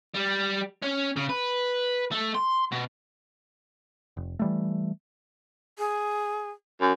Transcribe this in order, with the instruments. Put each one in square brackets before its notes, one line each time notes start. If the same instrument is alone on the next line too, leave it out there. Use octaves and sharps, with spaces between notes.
[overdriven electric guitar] G3
C#4
C#3
B4
A3
C6
B2
[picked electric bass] F1
E3 G3 A3
[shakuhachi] G#4
[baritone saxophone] F#2